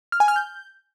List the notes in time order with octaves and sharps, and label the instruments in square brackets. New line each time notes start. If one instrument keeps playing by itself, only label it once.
[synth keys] F6
G#5
F6
G6